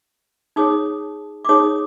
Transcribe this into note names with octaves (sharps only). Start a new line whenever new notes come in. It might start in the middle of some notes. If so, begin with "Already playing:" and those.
D#4 G#4 C#5 D#6
D6
D#4 G#4 C#5 D#6